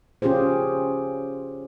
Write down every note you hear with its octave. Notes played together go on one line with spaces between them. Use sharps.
C#4 F4 G4 G#4 C5